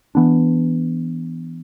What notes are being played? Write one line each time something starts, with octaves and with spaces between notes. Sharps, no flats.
E3 B3 D4